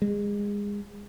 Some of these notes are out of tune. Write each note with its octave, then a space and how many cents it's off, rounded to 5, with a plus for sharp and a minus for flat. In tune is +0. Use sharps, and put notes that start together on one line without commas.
G#3 -25